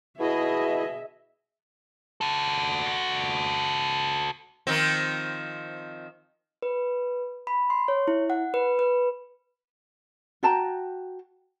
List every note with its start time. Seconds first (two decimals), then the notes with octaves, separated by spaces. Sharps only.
0.19 B2 E4 G#4 D#5 E5
2.21 F#4 A4
4.67 D#3 F3 C4
6.62 B4
7.47 B5
7.70 C6
7.88 C#5
8.08 E4
8.30 F#5
8.54 B4
8.79 B4
10.43 F#4 G5 A5 A#5